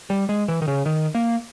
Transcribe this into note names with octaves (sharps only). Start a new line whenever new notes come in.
G3
G#3
E3
D#3
C#3
D#3
A#3